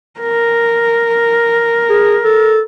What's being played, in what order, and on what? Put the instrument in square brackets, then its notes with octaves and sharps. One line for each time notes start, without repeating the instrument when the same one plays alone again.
[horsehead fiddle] A#4
[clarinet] G#4
A4